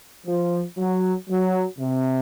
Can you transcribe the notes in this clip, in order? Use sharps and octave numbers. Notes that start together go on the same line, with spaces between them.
F3
F#3
F#3
C3